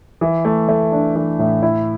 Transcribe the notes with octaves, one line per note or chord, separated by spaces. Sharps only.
E3
A3
A3
D4
E3
A2
E4